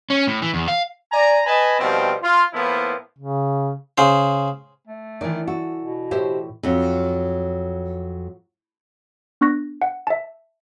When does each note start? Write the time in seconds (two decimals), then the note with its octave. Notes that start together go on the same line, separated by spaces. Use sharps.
0.10 C#4
0.27 A2
0.42 E3
0.54 E2
0.68 F5
1.12 D5 G#5 A#5
1.46 B4 D#5 G#5 A5 B5
1.80 B2 D#3 F3 G3 C4
2.22 F4
2.54 A2 F3 A#3 B3 E4
3.18 C#3
3.98 C#3 C5
4.87 A3
5.21 D#3 E3 D5
5.47 F#4 A4
5.82 B2
6.11 A2 G4 C5 E5
6.63 F2 F#3
9.41 B3 D4 C#6 F#6 A#6
9.82 F#5
10.07 E5 A5